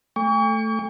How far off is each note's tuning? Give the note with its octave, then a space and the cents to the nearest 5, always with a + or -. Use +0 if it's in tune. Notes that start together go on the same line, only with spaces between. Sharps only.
A3 +0 G5 +45 C#6 +35